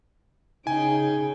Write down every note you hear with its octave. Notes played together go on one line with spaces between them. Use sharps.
C#3 D#4 G#4 G5 G#5